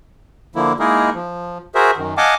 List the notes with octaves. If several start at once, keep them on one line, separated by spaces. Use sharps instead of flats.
D3 F3 A#3 E4
G#3 A#3 D#4 E4 G#4 A#4
F3
F#4 G#4 A#4 C5 E5
F#2 D#3
D#5 F5 F#5 G#5 A5 D6